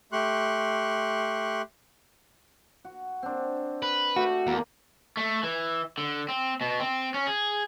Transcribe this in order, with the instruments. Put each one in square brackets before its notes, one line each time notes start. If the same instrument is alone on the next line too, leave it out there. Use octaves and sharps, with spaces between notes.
[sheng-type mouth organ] A3 G4 C6 C#6 F#6
[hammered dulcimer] F#4
C4 D4
[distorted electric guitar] B4
[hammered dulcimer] A3 G4 [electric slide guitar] F#4
[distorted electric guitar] E2 [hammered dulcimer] A#3
[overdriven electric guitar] A3
E3
D3
C4
B2
C4
C#4
G#4